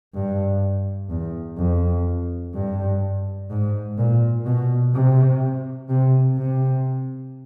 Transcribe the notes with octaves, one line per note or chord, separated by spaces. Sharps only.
G2
E2
F2
G2
G#2
A#2
B2
C3
C3
C3